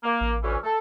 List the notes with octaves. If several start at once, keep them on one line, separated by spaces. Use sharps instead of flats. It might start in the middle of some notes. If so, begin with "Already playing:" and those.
A#3
A1
D2 E3 C#4
A4